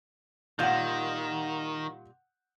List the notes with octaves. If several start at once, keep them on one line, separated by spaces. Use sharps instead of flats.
A#2 D#3 G3 F4 F#5 G6